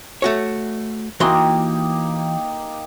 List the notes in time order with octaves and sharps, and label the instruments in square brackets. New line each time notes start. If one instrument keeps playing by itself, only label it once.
[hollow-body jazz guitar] A3 F#4 C#5
[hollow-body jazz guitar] E3 F#4 C6 [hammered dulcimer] A#3 D#4 G4